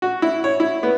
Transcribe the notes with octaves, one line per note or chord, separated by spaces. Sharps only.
F#4
E4
C#5
E4
B3